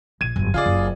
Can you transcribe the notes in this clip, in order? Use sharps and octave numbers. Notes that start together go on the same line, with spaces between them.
A#1 G#6 D#7
G1 F#2
C#3 F4 G#4 D5
F#1